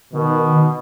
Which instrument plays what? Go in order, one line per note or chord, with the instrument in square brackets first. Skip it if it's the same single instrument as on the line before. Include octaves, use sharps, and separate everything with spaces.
[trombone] B2 [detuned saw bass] D#3